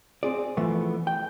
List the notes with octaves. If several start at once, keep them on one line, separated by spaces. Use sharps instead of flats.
C4 G#4 D5
E3 F3 A3 B3
G5